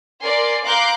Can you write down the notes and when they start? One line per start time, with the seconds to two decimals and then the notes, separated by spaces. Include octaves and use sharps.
0.23 A#4 D5 G#5 C6
0.66 F5 A#5 C6 D6 F#6 G6